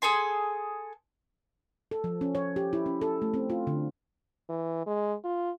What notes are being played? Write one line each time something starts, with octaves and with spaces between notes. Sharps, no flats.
G#4 A4 G#5 C6
A4
F3
C#4
C#5
G4
E4
C#4
A4
A3
C4
F4
D3
E3
G#3
F4